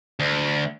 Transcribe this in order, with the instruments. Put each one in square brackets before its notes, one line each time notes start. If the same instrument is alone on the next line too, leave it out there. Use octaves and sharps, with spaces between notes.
[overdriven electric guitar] D2